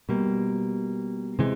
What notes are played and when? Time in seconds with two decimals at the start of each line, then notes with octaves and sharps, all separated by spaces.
0.09 B2 G3 A#3
1.39 C3 E3 G#3